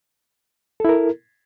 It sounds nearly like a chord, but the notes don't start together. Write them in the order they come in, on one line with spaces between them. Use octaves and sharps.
A4 E4 A#4